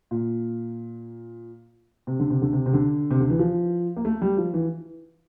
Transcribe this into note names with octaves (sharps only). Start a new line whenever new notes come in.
A#2
C3
D3
C3
D3
C3
C3
D3
C3
D3
E3
F3
A#3
A3
G3
F3
E3